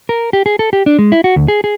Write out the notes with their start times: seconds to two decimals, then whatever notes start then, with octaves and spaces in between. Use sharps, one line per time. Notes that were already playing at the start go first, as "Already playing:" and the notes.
0.09 A#4
0.33 G4
0.46 G#4
0.59 A4
0.73 G4
0.86 D4
0.99 G#3
1.12 E4
1.24 F#4
1.36 D2
1.48 G#4
1.64 G#4